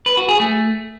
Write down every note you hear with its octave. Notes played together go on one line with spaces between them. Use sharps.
B4
F#4
G#4
A3